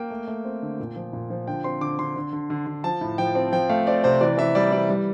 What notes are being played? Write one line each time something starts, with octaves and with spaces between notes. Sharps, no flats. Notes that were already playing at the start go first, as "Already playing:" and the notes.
Already playing: A#3 G5
A3
A3
C4
D3
A#2
F3
A#2
F3
D3 G5
C4 C6
D3 D6
D3 C6
D3
D3
D3
D3
F3 A5
A2
F3 G5
C4
F3 G5
A3 F5
C4 D5
C3 C5
E3 D5
E3 E5
G3 D5
E3 D5
G3